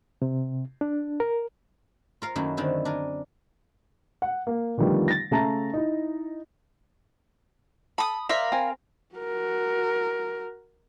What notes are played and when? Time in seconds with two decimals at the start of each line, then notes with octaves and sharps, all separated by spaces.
0.22 C3
0.81 D4
1.20 A#4
2.22 F4 A#4 F5
2.35 F#2 D#3 F#3 A3 A#3 E4
2.57 D3 D#3 C4 E4 F#4
2.85 D4 A#4 G#5
4.22 F#5
4.47 A#3
4.78 D3 D#3 F3 G3 A3 B3
5.08 A6 A#6
5.31 C#3 A3 E5 A5 A#5 A6
5.73 D#4 E4
7.98 A4 B5 D#6
8.29 A#4 C5 D5 E5 F5 B5
8.52 C4 G#5
9.15 F#4 A#4